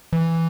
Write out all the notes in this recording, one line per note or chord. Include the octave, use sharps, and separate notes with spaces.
E3